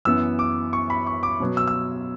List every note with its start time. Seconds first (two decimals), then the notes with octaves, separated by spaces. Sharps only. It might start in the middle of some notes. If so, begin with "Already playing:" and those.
0.05 F#2 E3 B3 E6
0.39 D6
0.73 C#6
0.90 B5
1.07 C#6
1.23 D6
1.40 B2 F#3 B3
1.57 E6
1.67 E6